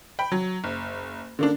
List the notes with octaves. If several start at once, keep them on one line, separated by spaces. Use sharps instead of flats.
G5 B5
F#3
F#1
D3 A#3 D4